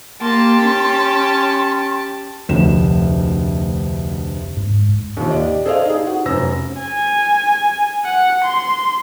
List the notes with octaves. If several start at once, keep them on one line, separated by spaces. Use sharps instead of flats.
A#3 G4 A5 C6
C#4
F1 D2 E7
G#2
A#1 D#2
G4 D5 D#5
G#4 A4 C5 D5 D#5 F5
D#4 G#4
F#4
F1 F#2 C5 E6 A#6
G#5
F#5
C6